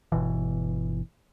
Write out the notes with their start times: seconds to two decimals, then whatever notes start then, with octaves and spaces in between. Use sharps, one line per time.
0.12 G1 B2 E3